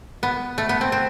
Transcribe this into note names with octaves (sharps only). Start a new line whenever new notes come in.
B3
A3
B3
C4
C4